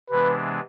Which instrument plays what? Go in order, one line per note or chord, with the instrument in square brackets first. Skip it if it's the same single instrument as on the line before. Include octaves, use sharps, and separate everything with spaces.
[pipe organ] C3 E3 G#3 B3 D4 [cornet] B4